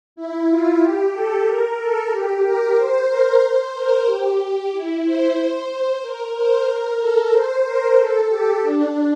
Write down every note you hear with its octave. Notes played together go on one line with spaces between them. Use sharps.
E4
F4
G4
A4
A#4
A4
G4
A#4
C5
A#4
C5
A#4
G4
E4
C5
C5
A#4
C5
A#4
A4
C5
A#4
A4
G4
D4